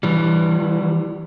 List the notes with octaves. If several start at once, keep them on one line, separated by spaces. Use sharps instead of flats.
E3 G3